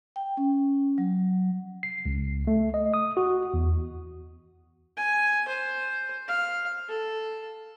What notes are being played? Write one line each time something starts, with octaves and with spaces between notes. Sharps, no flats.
G5
C#4
F#3
C7
C#2
A3
D#5
D#6
F#4
E2
G#5
C5
F5
A4